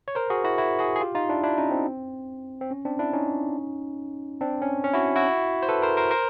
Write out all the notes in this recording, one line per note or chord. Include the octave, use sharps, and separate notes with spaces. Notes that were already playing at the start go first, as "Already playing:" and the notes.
C#5
A#4 C5
F#4 G#4
E4 F#4
E4 F#4
F#4 G#4
G#4
F4 G4
D#4 F4
D4 E4
D4 E4
C#4 D#4
C4
C4
C#4
C4 D4
D4 E4
C#4 D#4
C4 D4
C#4
C#4
E4 F#4
E4 F#4
C5
A4 B4
A#4 C5
A#4 C5
A#4 C5